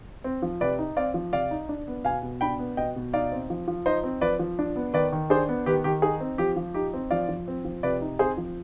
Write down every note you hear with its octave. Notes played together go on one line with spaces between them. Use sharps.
C4
F3
C3 B4 D5
D#4
C4 D5 F5
F3
C3 D5 F5
D#4
D4
B3
B2 F5 G#5
B2
D4 G5 B5
B3
B2 D#5 G5
B2
D#4 D5 F5
C4
F3
F3
D#4 C5 D#5
C4
F3 B4 D5
F3
D4
B3
D#3 B4 D5
D#3
D4 G#4 C5
B3
D#3 G4 B4
D#3 G4
D#4 G#4
C4
F3 G4
F3
D#4 G4
C4
F3 D5 F5
F3
C4
F3
C3 B4 D5
D#4
C4 G#4 C5
F3